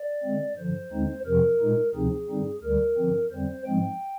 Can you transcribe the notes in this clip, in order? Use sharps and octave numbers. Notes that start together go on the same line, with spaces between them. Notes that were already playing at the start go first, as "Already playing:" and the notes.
Already playing: D5
D3 G#3 C4
G2 D3 F3 C5
D#2 D3 G#3 C4 D#4
F2 C3 F3 A#4
A#2 G#3 D#4
D2 C3 F3 C4 D#4 G#4
G2 D3 G3 C4 D#4
D2 D3 G3 A#4
G2 D3 F3 C4
F2 D3 G3 C4 C5
G#2 F3 G#3 C4 G5